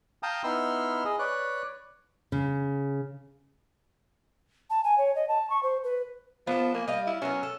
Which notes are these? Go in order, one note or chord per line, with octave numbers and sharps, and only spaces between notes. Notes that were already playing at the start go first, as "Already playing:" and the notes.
F5 G5 A5 A#5 D#6
B3 D#4 E4 C6 E6 F6
G#4 D#5
B4 C#5 D5 F#6
C#3
A5
G#5
C#5
D#5
A5
C#6
C5
B4
F3 B3 A5
A#3 G#5
G3 D#5 F5
E4
F#3 B3 C#4 A#4
A4